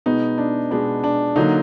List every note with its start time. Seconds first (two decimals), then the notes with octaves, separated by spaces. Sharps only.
0.06 B2 G#3 B3 D#4
0.38 D4
0.71 B2 G#3 B3 D4
1.04 D4
1.36 D3 F#3 A#3 D#4